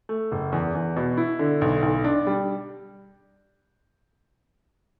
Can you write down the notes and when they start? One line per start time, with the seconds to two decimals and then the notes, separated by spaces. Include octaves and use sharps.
0.09 A3
0.32 F#1
0.52 E2
0.75 E2
0.96 B2
1.17 E4
1.39 D3
1.61 B1
1.82 B1
2.04 D4
2.27 G3